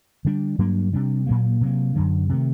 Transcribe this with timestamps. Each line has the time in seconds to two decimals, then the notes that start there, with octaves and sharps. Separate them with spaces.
0.25 D3 G3 D4
0.58 G2 F#3 A#3 D4
0.93 C3 G3 D4
1.26 A#2 F#3 A#3
1.61 C3 F#3 A#3
1.96 F#2 D3 F#3
2.29 C3 D#3 A3